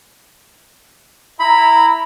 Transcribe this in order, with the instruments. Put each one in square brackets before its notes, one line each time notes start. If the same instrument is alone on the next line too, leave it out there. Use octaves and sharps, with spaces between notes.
[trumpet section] E4 A#5 [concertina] B5